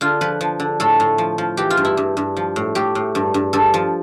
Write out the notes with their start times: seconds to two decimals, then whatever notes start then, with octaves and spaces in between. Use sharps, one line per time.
0.01 D3 F4
0.21 F3 B4
0.41 F3
0.60 D3
0.80 A2 A4
1.00 A2
1.18 F3
1.38 F3
1.57 E3 G4
1.70 F4
1.77 G2
1.85 E4
1.97 G2
2.17 G2
2.37 F3
2.56 A2
2.75 A2 G4
2.95 A2
3.15 G2
3.34 G2
3.53 G2 A4
3.74 F3